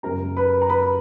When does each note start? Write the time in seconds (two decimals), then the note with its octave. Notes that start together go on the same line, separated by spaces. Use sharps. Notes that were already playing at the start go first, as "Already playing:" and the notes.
0.03 F#2 C#3 A#4 A#5
0.36 B4 B5
0.62 A#5
0.69 B4 B5